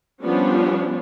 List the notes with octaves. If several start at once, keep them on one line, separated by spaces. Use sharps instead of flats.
F3 G3 B3 C#4 D4 F4